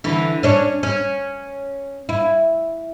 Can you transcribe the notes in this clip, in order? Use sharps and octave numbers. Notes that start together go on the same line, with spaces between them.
D3 E3
C#4 D4 C#5
C#4
E4